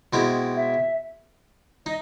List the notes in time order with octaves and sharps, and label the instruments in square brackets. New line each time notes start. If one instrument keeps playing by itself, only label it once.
[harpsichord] B2 G#3 C4 E4 G4 [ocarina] D#5
[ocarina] E5
[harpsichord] D#4 [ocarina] D#5